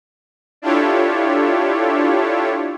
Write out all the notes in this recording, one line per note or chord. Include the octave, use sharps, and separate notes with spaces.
D4 E4 F4 G4 A4 C#5